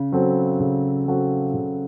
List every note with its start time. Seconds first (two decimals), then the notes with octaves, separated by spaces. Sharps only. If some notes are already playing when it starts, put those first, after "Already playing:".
Already playing: C#3
0.12 F#3 C4 F#4 A4
0.60 C#3
1.07 F#3 C4 F#4 A4
1.54 C#3